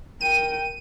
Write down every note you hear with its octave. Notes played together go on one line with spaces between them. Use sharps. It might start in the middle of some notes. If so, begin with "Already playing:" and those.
A#4 G5 D#7